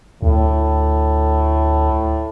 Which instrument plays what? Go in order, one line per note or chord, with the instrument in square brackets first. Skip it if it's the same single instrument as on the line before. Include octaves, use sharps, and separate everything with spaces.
[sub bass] D2 [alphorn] A2